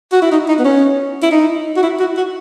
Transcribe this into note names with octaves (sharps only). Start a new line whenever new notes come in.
F#4
E4
D#4
D#4
B3
C#4
E4
D#4
F#4
E4
F#4
F#4